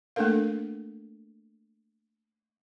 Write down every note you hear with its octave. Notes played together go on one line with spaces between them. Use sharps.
A3 A#3 D4 A4 A#4 F5